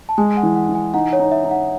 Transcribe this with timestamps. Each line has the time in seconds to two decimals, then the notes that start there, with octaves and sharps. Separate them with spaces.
0.09 A5
0.18 G#3 G#5
0.37 F#5
0.43 E3
0.56 F#5
0.69 E3
0.75 G#5
0.94 D#4 F#5
1.13 C#5
1.19 D#4
1.32 E5
1.44 D#4
1.51 F#5